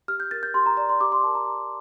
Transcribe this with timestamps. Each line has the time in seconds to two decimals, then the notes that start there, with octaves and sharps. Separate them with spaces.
0.08 G4 F6
0.20 G6
0.31 A#4 A6
0.43 G6
0.54 G4 C6
0.66 A#5
0.77 D5 A#5
0.89 C6
1.01 G4 D6
1.12 C6
1.24 A#4 A5
1.35 A#5
1.47 G4